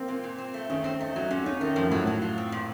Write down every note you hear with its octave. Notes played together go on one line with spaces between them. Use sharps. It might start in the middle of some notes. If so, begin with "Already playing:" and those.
Already playing: A#3 C4
A#2
A#2
C4
A3
D#3 C#4
C4
A3 D#4
F#3 D#4
A#2 C#4
C#4 D#4
D#3 A3
F#2 F3
A2 F#3
F#3
F4
C4
A#2